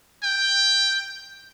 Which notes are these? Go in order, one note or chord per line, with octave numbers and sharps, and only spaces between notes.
G5